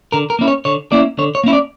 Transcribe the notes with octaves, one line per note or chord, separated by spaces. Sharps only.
D3 A#4
A#4
A#3 C#4 E4
C#5
D3 C#5
A#3 C#4 E4 D5
D3 C#5
C#5
A#3 C#4 E4
D5